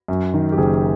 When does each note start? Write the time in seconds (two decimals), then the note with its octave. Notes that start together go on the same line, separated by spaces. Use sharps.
0.08 F#2
0.34 D#3
0.52 G4
0.58 F#1 G#4